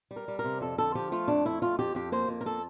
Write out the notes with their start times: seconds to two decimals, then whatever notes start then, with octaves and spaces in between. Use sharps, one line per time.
0.11 G3
0.16 A#4
0.28 G3
0.39 A#4
0.44 C3
0.61 F2 A4
0.78 D3 A4
0.95 F3 G4
1.12 A3 F4
1.28 F2 D4
1.45 A3 E4
1.62 F2 F4
1.79 F2 G4
1.95 F2 G4
2.12 A#3 C5
2.28 F2
2.41 A#4
2.46 A#3 A4